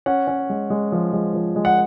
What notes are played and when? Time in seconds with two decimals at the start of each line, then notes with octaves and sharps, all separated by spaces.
0.06 C#4 F#5
0.27 C#4
0.50 G#3
0.70 G#3
0.92 F3
1.13 G#3
1.34 F3
1.56 G#3
1.65 F#5